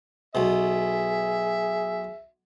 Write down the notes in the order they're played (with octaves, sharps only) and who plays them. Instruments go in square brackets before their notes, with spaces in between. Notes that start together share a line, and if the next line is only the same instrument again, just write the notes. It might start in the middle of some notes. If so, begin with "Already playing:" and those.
[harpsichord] B1 B2 [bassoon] G#4 [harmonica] E5